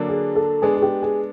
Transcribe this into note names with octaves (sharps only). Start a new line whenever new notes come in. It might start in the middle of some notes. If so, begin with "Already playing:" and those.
Already playing: D3 F#3 A#3 D4
G#4
A4
G#3 B3 D4 G#4
G#4
G4
G#4